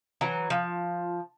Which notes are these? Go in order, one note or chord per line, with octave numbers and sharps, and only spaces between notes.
E3 F#3 A#5
F3